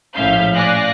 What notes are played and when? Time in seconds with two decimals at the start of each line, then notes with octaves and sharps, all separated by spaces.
0.15 A#1 A2 C#4 E5 F5 G6
0.55 D5 F5 G#5 F#6 A#6